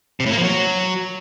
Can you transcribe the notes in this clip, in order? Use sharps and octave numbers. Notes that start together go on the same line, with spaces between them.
C3
A2
A#3
F3
F#3